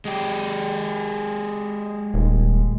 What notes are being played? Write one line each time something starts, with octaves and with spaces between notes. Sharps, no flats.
G#3 G4
D#1